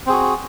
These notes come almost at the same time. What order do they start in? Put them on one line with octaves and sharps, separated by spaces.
C4 G#4 F#4